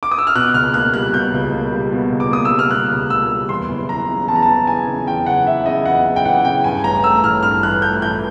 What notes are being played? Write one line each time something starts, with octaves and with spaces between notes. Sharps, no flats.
D6
D#6
E6
F6
B2 F#6
C#2 F6
A#3 F#6
G3 F#6
B2 G6
C#2
A#3
G3
B2
C#2
D6
A#3 D#6
E6
G3
F6
B2 F#6
C#2
A#3 E6
G3
E2 C6
F#1
E3 A#5
C#3
E2 A5
A#5
A5
F#1
E3 G#5
C#3
E2 G5
F#1 F#5
E3 E5
C#3 D#5
E2 F#5
F#1
G5
E3 F#5
C#3 G5
G2 G#5
A1 A#5
A3 E6
E3 F6
G2 F6
A1 F#6
A3 G6
E3 G6